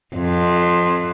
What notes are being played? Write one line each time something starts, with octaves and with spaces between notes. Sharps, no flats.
F2